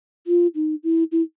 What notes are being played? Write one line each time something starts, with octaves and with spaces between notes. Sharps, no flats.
F4
D#4
E4
E4